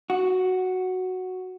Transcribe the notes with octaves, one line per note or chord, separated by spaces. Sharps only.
F#4